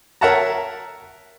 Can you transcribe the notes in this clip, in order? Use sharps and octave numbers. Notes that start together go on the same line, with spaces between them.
A#4 C#5 E5 F#5 A5 A#5